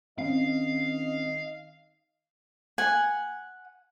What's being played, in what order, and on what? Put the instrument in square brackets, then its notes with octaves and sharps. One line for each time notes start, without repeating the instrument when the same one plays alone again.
[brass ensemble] D#3 D#5 [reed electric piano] C4 C#4 [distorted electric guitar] F5
[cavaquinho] F#5 G#5